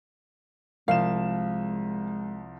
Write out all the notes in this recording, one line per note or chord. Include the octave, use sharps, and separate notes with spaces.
C2 F3 G#3 F5 E7